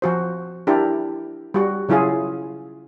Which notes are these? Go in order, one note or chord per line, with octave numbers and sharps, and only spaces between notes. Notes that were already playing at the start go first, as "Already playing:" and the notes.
F3 F#4 C5
D4 E4 G4 A#4
G3 F#4
C#3 F#3 E4 F4 G#4